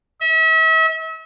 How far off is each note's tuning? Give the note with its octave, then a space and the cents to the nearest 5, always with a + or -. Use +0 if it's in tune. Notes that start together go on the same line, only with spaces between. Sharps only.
E5 -40